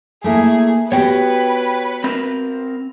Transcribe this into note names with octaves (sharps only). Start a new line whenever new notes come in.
A3 A#3 E4 G#4
B3 F#4 G4 B4 C#5 G5
C4 A#4